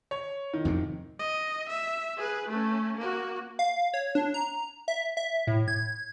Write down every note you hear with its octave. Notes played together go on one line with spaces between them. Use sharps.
C#5
D#3
F2 G#2 C3
D#5
E5
G#4 B4
A3 C#4
A#3 F#4
F5
C#5
D4
A#5
E5
E5
A2
G#6